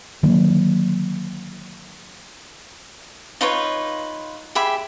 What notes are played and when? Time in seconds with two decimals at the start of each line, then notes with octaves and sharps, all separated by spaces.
0.23 D3 D#3 F#3 A#3
3.41 D#4 F4 B4 C#5
4.55 G4 G#4 E5 B5